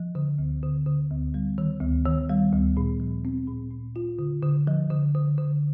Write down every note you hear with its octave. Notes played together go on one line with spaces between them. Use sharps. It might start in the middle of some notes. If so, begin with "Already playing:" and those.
Already playing: F3
D3
D2
D3
D3
D2
G3
D#3
D2
D#3
G3
D2
A#2
F3
C4
A#2
A#2
F4
D3
D3
F3
D3
D3
D3